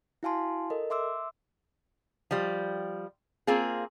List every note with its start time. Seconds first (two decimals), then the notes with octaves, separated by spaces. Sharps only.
0.23 E4 F#4 F5 G#5 A5 C6
0.70 A4 A#4 D#5
0.90 E5 C6 D6 E6
2.31 F3 G3
3.47 A#3 C4 F4 G#4